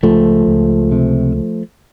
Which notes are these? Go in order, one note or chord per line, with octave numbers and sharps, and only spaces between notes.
C#2 F3 A3
C#2
C3